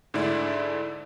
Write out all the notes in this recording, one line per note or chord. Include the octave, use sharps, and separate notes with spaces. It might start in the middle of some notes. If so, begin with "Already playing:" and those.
G#2 D3 A3 E4 D5